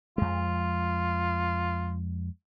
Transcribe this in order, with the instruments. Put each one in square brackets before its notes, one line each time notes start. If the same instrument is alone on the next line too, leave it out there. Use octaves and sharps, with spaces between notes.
[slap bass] F2 G#3 [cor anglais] F4